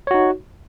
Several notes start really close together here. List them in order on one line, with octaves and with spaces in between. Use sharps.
C#5 F#4 D#4